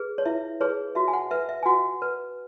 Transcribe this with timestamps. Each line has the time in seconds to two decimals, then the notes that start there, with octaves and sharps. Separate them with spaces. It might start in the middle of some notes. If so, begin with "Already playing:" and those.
Already playing: G#4 B4
0.18 C#5
0.25 E4 E5
0.61 G#4 B4 C#5
0.95 F#4 E5
1.08 G#5
1.13 F#5
1.31 B4 E5
1.49 E5
1.63 G#5
1.66 F#4 F#5
2.02 B4